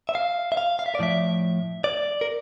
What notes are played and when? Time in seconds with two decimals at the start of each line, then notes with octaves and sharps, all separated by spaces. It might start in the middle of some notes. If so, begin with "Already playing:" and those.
0.09 E5
0.15 F5
0.52 E5
0.57 F5
0.79 F5
0.86 E5
0.95 D5
0.99 A2 F3 E5
1.84 D5
2.21 A#4